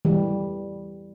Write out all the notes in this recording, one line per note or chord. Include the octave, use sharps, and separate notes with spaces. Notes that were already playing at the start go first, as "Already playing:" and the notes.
E3 G3